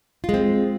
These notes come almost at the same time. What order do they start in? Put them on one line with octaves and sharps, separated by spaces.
F4 G#3 C4